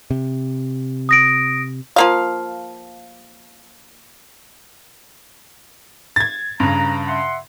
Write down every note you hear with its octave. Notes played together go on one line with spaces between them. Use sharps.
C3
D#6 A#6 D7
F3 A#3 F5
G#6 A6
G2 C#3 A#5
E5 F#5 C6